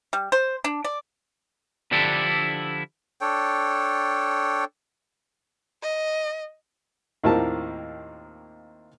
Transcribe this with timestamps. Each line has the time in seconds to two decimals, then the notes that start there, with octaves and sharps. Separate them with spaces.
0.13 G3
0.32 C5
0.64 D4
0.84 D5
1.91 D3 F3 D4 E4 G4 A4
3.21 D4 A4 C#5 G5
5.82 D#5
7.24 D#2 A2 A#3 C4 F4 A5